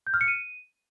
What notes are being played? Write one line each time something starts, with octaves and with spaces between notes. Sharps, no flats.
G6
F6
C#7
D#7